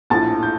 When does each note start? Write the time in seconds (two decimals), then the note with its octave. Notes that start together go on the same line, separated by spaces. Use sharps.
0.10 A#1 A2 F3 A5 A6
0.43 G6